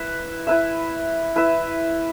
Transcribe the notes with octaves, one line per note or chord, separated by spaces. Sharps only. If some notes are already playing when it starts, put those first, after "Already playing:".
Already playing: E4 B4 E5
E4 B4 E5
E4 B4 E5